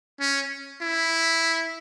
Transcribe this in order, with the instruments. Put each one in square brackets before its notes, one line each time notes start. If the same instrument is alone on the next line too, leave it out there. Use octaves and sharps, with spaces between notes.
[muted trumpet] C#4
E4